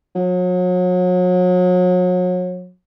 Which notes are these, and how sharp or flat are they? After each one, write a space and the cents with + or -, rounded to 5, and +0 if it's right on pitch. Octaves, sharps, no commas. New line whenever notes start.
F#3 -35